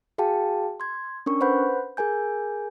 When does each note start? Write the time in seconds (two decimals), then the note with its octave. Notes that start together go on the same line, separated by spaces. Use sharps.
0.18 F#4 G#4 F5 G5 A5
0.80 C6 G#6
1.26 C#4 D4 A#4 C#6
1.41 B4 C5 F#5 B5 G6
1.97 G#4 A#4 G#5 G6